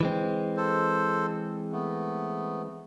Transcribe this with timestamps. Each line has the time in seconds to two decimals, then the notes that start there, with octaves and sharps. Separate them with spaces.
0.01 E3 G#3 C4
0.57 A4 C5
1.72 A3 B3